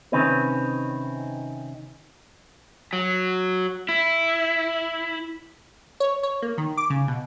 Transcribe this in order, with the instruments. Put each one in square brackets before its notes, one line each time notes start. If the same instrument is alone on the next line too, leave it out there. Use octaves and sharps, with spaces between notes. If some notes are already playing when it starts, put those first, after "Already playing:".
[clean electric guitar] C3 D#3 C4 C#4 D#4 B4
[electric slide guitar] F#3
E4
[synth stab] C#5
C#5
A#3
D#3
D6
C#3
B2